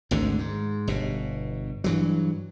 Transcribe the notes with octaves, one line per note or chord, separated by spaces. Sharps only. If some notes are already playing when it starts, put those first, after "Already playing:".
G#1 D2 G#2 D3
G#2
G1 B2
G2 E3 F#3